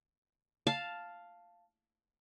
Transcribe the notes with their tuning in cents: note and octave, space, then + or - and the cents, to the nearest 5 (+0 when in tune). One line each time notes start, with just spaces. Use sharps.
F5 +0 A5 +0